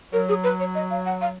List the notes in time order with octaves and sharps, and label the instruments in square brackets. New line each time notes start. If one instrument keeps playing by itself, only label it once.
[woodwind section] F#3 [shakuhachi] A#4
[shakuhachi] G#4
B4
C#5
D#5
F5
F#5
F5